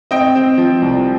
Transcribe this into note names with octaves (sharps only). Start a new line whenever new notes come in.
C4 D#5 G5
C4
F3
C2